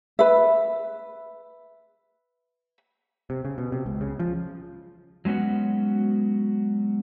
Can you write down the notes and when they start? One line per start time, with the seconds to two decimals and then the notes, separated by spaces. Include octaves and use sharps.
0.19 B4 E5
3.30 C3
3.45 C#3
3.58 B2
3.72 C3
3.86 C#2
4.01 C#3
4.20 F3
5.25 F#3 G#3 B3 C#4 F#4